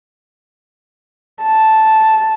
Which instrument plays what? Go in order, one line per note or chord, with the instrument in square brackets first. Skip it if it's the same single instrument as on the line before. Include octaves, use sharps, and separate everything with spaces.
[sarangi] A5